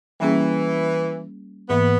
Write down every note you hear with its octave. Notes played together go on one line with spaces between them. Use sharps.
E3 G3 A#3 C#4 G#4
G#2 E3 A#3 B3